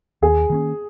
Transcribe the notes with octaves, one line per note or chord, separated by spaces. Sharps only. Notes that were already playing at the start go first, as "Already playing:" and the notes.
D#2 G#4
D#3 A#3 C#4